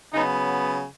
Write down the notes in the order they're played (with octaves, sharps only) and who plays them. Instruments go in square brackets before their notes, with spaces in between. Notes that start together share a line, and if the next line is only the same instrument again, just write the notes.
[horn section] C#3 F#3 B3 D#4